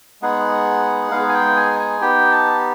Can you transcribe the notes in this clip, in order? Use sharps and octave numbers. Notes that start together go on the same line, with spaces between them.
G#3 B3 D#4 G#4 F#5
G#3 B3 D#4 G#4 F5
G#5
G5
G#5
G#5
B3 D#4 G4 G5
A5